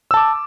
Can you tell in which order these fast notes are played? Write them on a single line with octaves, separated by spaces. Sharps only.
E6 A5 D6